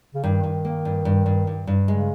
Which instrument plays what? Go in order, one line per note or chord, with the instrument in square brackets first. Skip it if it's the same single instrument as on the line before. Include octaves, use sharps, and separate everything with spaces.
[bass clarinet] C#3
[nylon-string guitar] G2 [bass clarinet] D#3
[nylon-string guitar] G2
A#3
G2
G2
G2
G2
G2
[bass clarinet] C#3 [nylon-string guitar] G#3